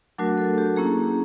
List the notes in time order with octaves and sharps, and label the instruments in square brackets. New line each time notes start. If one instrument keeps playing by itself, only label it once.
[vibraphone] F#3 A3 D4 F#4 A#4
A4
G4
A#3 C#4 E4 G#4